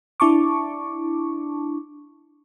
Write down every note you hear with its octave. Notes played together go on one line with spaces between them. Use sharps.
D4 E4 A5 C#6 D6